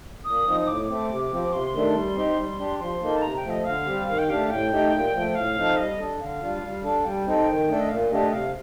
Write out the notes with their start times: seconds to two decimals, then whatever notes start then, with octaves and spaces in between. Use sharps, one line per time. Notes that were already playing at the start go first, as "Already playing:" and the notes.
0.24 A#2 D#6
0.46 F3 C4 D#4
0.61 D#6
0.67 A2 D6
0.89 A3 C4
1.10 C3
1.31 F3 C4
1.52 C3 C6
1.73 D#3 A3 D4
1.95 G3
2.15 C4 D#4 G4
2.37 G3
2.59 D4 G4
2.79 F3 C6
3.01 A#3 D#4 A4
3.16 A5
3.22 C3 A#5
3.37 G5
3.43 F3 A3
3.50 D#5
3.65 D3 F5
3.86 G3 C4 G4
4.08 D#3 F5
4.19 G5
4.29 A3 D4 G4 F5
4.49 A2 G5
4.71 A3 D#4 G4
4.92 A#2
5.13 F3 A3
5.35 A2 F5
5.56 F3 C4 D#4 A4
5.77 G3 D#5
5.99 D4 A4
6.20 D3 F5
6.41 G3 D4 F4
6.62 G3
6.83 D4 A4
7.05 G3 G5
7.26 C4 D#4 A4
7.48 D#3
7.69 A3 D4 A4
7.80 D#5
7.89 A#2 F5
8.11 A3 D4 G4 D#5
8.32 C3 F5